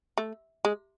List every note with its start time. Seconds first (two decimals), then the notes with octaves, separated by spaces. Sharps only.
0.18 A3
0.65 G#3